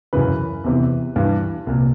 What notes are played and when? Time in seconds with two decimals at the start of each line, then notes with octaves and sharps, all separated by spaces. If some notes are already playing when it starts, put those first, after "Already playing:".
0.13 F#2 C#3 E3 B4
0.64 E2 C3 E3
1.16 G2 E3
1.67 C2 A#2